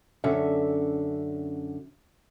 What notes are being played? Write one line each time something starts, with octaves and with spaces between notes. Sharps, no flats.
F#2 D3 C#4 E5